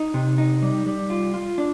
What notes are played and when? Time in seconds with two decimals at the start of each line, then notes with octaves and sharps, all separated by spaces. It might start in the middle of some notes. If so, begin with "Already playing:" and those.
Already playing: D#4
0.14 C3
0.38 D#4
0.62 G3
0.86 G3
1.10 F4
1.34 F4
1.58 D4